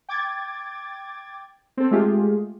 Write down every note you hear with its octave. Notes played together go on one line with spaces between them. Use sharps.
G5 D6 G#6 A6
C4 A4
G#3 A3 F4 G4 G#4